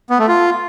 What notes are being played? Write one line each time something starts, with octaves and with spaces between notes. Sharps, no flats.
B3
A3
F4